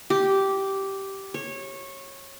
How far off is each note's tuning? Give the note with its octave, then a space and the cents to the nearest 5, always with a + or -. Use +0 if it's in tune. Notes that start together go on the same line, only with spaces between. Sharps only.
G4 -10
C#5 -20